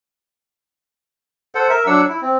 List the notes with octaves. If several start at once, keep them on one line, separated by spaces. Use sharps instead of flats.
A4 C5 F#5
A#4 E5
F#3 D4 F#5 E6
E4
C4